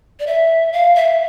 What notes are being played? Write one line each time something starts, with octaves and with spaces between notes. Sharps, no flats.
D5
E5
F5
E5